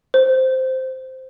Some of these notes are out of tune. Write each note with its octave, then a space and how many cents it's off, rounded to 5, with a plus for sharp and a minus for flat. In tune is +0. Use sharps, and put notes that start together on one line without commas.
C5 -5